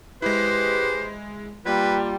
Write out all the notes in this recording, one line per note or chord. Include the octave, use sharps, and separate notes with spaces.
G#3 E4 G4 G#4 B4 C5
G3 A#3 F4 B4